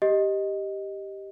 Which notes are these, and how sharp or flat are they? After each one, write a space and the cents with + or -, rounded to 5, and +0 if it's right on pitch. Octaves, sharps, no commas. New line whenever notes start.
G4 +0 D#5 +0